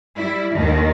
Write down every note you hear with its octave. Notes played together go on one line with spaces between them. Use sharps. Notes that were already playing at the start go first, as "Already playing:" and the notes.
G3 E4
D#2 D#3